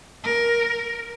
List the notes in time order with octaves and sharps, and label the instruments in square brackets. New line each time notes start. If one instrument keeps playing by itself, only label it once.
[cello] A#4